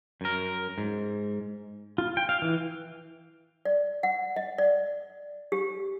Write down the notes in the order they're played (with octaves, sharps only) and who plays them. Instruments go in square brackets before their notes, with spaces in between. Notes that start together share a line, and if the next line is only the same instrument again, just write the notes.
[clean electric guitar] F#2 A#4
G#2
[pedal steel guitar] F4
G5
F5
E3
[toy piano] D5
F#5
D#5
D5
G4